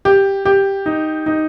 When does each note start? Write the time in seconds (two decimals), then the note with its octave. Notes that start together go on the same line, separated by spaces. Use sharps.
0.05 G4
0.45 G4
0.86 D#4
1.26 D#4